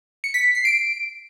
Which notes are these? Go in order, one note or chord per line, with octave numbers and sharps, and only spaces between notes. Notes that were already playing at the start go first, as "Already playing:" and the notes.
C#7
B6
B6
C7
D7